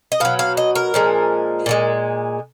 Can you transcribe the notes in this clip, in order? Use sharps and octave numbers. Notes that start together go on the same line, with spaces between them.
D#5
B2 F#3 F5
F5
D#5
A#4
A#2 F3 G#3
A#2 F3 G#3